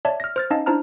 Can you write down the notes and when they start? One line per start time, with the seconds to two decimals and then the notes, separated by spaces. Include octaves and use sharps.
0.05 C#5 D5 E5 A5
0.20 F6 A#6
0.36 C5 F6 A6
0.50 C#4 D#4 D#5 F5 A5
0.66 D4 E4 C5 A5 A#5 F6